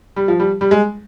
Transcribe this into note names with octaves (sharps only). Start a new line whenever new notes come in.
G3
F3
G3
G3
G#3